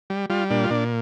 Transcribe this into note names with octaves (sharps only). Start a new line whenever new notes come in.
G3
G3 F4
A#2 D4
F4
A#2 D4